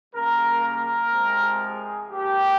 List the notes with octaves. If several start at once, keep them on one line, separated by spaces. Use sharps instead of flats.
C#3 G3 A#3 A#4
A#4
C3 F3 G#3 C4
G#4
G#2 F3 A#3 G4